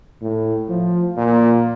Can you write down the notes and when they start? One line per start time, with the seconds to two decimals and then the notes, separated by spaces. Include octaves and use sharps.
0.22 A2
0.69 F3
1.17 A#2